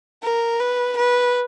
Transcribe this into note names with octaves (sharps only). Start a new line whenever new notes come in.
A#4
B4
B4